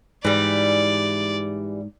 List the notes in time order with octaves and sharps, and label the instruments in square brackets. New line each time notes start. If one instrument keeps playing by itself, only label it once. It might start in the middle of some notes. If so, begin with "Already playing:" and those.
[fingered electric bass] G#2 [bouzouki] E3 G3 [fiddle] D5